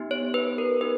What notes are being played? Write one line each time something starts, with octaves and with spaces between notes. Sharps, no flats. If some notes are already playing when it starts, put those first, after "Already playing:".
Already playing: B3 D#4 G4
C#5
B4
A#4
D#4 G4 B4